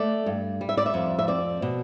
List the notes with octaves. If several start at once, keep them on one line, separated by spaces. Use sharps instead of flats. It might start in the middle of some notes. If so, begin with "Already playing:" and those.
Already playing: A3 D5
G2
G3
E5
D5
E5
F2
E5
C4 D5
B2